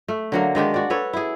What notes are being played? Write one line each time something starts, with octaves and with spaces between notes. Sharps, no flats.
A3
D3 F#3 A#3
D#3 G#3 D4 G4
F#4 D5
A4 B4 C#5
E4 G#4